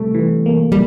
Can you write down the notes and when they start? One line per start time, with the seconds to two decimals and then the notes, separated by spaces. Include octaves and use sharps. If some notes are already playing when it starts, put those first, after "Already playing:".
Already playing: C3 G3 A3
0.15 E3
0.46 A#3
0.72 G3